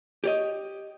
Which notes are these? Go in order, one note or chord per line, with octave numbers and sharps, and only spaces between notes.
G4 C#5 D#5